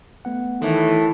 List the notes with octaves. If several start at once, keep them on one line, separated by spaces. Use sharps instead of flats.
A3 B3 F#5
A2 D#3 E3 A3 D#4 E4